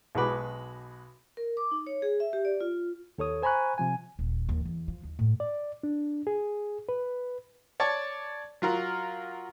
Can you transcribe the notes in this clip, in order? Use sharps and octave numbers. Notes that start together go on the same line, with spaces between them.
B1 G#3 F#4 B4 D6
A#4
D6
D#4
C#5
G#4
E5
G4
D5
F4
D#2 A4 C#5 D#6
C5 G#5 A#5 B5 C#6 F#6
C3 F3 G#5
D#1
D#2
E2
F3
D#2
A2
D5
D4
G#4
B4
C#5 D5 A5 C#6
F#3 F4 A#4 F#5